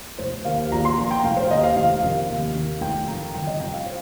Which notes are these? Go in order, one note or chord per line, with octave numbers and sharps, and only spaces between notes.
F1 C5
D#2 D#3 F5
A#1 A#5
C6
A#2 F3 A#5
G5
F1 F5
C5
D#2 D#3 D#5
F5
F1 F5
F2 C3 D#3
D#2
D#3
F1 G5
F2 D#3 A#5
G1 G5
D#5
F2 C3 F3 G5
F5
C5